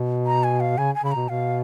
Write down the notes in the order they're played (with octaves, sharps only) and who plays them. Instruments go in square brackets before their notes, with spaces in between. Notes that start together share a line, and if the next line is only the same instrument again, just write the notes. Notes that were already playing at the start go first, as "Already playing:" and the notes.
Already playing: [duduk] B2
[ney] A#5
G#5
F5
[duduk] C#3 [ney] G#5
[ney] G#5
[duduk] C#3 [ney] B5
[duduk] B2 [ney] A#5
[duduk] B2 [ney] F5